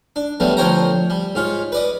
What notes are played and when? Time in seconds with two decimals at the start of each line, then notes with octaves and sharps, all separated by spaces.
0.16 D4
0.40 E2 F#3 G3 A3 B3
0.57 D2 F3 C5 C#5 G5 A#5
1.10 G3
1.35 G#2 F4 C#5
1.72 B4 D5 D#5